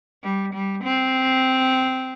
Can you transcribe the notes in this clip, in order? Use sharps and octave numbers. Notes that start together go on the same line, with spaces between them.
G3
G3
C4